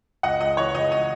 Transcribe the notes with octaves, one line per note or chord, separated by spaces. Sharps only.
C#2 D#5 F#5
C#2 D#5
E3 C#5
C#2 D#5
D#5